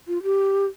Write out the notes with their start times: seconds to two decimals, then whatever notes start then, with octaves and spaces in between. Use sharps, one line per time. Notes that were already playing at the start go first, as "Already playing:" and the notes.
0.08 F4
0.23 G4